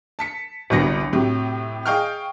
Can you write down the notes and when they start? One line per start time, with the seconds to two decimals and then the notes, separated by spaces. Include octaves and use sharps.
0.19 A5 B6 C#7
0.70 G1 C2 F#3 B3 A#6 C#7
1.13 A2 C3 F#3 G4
1.86 G#4 D#5 F5 G5 C#6 F6